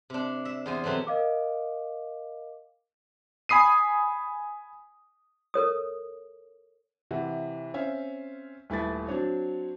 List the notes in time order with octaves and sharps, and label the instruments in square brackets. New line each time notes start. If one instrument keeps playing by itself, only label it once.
[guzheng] C3 D4
E5
E2 C5 G#5
C3 E3 F#3 A3 C4
[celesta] A#4 D#5 F5 D6
[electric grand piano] G#5 B5 D#6 C7 D#7
[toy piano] A4 A#4 C#5 D#6
[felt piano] C3 E3 F#5
C4 C#4 E5 F5
D#1 A3 E4 B4 A6
F#3 C4 D4 C#5